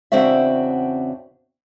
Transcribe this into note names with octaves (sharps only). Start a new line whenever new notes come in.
E2 C#3 C4 D4 F#4 E5